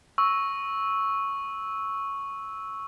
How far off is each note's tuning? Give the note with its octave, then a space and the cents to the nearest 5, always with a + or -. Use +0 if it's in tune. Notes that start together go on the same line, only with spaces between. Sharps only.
C#6 +0 E6 -10